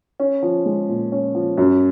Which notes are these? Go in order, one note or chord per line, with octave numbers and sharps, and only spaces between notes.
C#4
F3
G#3
A#2
C#4
F3
F#2